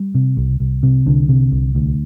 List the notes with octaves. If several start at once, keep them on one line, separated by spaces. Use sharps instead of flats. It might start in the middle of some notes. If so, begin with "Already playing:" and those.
Already playing: G3
C3
C2
C2
C3
C2 D3
C3
C2
D2